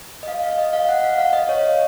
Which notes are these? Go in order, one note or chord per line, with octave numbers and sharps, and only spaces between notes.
D#5
F5
F5
D#5
F5
F#5
F5
F5
D#5
C#5